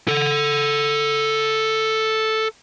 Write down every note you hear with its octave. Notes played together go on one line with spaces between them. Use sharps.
A4 F#5